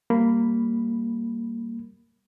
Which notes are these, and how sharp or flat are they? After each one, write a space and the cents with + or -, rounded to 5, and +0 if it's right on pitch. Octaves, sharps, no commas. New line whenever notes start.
G3 +0 A#3 -10 B5 +0